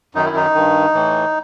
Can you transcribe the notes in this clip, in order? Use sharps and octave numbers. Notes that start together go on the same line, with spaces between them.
F#2 D#3 D#4
E4
D#4
G2 D#3
A2 E3